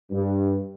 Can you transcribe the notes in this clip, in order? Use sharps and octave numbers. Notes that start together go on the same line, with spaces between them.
G2